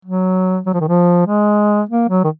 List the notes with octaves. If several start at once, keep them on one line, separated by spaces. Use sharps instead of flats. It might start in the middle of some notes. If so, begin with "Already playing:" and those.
F#3
F#3
F3
D#3
F3
G#3
A#3
F#3
D#3